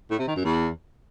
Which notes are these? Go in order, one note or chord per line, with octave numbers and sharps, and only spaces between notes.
A2
C3
D#3
F#2
E2